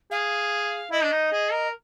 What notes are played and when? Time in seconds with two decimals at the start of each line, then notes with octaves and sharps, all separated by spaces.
0.11 G#4 F5
0.91 E4 D#5
1.03 D4
1.12 D#4
1.32 G#4
1.52 A#4